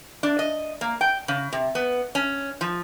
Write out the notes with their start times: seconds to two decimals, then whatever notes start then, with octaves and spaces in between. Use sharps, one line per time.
0.23 D4
0.39 D#5
0.81 A#3
1.01 G5
1.28 C#3
1.53 C3
1.75 B3
2.15 C#4
2.61 F3